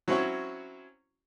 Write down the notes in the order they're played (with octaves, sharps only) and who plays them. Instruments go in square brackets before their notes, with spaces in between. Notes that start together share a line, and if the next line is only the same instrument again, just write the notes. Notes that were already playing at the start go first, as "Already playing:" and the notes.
[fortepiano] F#3 C4 C#4 E4 F#4